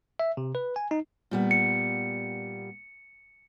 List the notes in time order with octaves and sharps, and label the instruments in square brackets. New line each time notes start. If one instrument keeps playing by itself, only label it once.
[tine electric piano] E5
C3
B4
G#5
D#4
[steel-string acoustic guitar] A#2 G3 B3
[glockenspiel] C#7